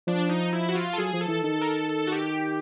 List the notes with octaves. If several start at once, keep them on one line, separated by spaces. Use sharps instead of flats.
F3 D4
D#4
E4
F#4
F4
A4
F#3 G#4
F3
A4
E3
D#3 A4
A#4
A4
A4
F#4
G4